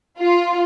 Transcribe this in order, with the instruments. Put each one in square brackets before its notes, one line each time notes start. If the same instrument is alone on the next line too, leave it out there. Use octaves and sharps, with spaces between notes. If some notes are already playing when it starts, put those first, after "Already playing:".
[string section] F4